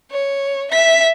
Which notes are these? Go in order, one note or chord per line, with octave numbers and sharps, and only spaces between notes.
C#5
E5 B6